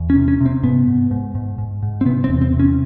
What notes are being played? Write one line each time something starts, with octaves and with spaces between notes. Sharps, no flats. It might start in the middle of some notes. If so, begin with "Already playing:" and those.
Already playing: E2
C#4
C3
C#4
C3
C4
G#2 B3
G#2
G#2
G#2
G#2
G#2
C4
C3 B3
C4
E2
C4
C3
C#4